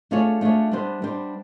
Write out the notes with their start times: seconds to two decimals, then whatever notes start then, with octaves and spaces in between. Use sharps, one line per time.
0.11 A3 D4 F4 G#4 C#5
0.41 A3 D4 F4 G#4 C#5
0.71 G3 B3 D4 G4 C5
1.02 G3 B3 D4 G4 C5